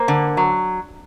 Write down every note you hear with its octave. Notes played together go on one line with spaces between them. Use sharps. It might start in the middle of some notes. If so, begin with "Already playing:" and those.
Already playing: A#3 C5
D3
F#3